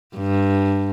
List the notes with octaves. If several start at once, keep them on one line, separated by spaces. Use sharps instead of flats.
G2